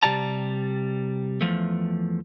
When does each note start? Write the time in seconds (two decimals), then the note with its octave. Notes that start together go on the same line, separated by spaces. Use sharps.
0.03 C3 G3 D5 A5 A#5
1.41 E2 F3 A3